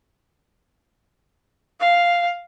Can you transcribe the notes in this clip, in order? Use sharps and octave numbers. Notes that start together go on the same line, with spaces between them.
F5